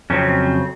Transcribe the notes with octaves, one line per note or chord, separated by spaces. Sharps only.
F2 C#3 F#3 C4 C#4